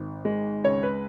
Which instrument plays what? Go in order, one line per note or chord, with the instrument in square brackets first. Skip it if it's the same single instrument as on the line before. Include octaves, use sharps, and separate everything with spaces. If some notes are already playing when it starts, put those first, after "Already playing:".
Already playing: [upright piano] G#1
G#3
C#2 C#5
B4